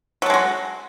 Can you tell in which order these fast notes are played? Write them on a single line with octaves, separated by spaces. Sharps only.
F#3 A4 G#3 F#4